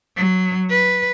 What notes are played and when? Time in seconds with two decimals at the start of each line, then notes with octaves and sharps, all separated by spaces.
0.17 F#3
0.70 B4